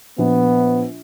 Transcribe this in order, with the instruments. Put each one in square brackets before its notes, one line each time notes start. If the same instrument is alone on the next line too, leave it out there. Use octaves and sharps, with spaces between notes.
[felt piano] A#1 [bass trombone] B3